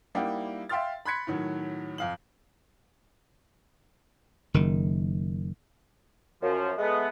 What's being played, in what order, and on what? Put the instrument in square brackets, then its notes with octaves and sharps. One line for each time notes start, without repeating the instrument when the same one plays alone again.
[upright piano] G3 A#3 D#4 E4 F#5 G5
E5 F5 G5 C6 F6 A6
B5 C6 F#6 G#6 B6 C#7
A2 D#3 F#3
F2 F5 F#7
[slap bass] F#1 D#3
[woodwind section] F#2 F3
G#3 A3 B3